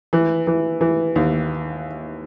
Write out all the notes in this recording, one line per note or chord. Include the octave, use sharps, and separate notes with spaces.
E3
E3
E3
D#2